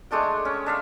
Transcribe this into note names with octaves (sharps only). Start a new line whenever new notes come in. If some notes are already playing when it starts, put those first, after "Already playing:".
G#3 A3 D4 G5
C#4
D4 E5 F5